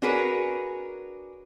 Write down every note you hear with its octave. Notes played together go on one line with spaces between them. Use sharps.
D4 F#4 G#4 A#4 B4 C#5